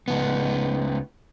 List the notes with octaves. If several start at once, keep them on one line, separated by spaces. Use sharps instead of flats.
C#2 B3